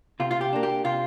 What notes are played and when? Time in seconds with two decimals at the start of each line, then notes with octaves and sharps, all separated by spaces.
0.20 C3 F4
0.31 F4
0.41 G4
0.53 A#3 D4
0.63 G4
0.84 C3 F4